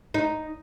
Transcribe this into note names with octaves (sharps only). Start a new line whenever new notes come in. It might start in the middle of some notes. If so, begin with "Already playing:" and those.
D#4